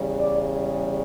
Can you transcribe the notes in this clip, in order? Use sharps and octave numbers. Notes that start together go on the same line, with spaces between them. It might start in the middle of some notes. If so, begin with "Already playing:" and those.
Already playing: E2 C#3 G3
D5